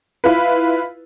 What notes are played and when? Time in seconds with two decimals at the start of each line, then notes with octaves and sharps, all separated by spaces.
0.24 E4 F4 B4